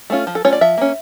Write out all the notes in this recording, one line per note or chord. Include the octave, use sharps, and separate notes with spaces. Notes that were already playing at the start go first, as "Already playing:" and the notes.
A3 C#4 F4
F3
A4
A3 C#4 F4 C#5
D5
F3 E5
A#3 C#4